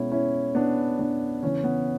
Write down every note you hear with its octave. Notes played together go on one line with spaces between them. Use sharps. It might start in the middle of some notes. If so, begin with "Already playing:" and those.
Already playing: B2 G#3 B3 C#4 E4
C#4 E4
B3 D4
B3 D4
C#3 E3 B3 C#4
B3